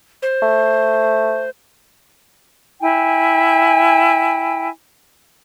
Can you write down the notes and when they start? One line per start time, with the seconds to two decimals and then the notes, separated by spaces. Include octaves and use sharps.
0.22 C5
0.42 A3
2.81 E4 G5 G#5